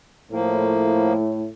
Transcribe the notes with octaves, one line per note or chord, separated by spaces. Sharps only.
A2 F3 A#3